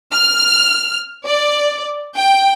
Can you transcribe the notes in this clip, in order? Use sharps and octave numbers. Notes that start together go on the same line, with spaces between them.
F6
D5
G5